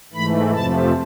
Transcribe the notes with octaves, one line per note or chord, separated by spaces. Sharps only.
G#2 E3 A3 B5
F2 C3 F3 A3 A5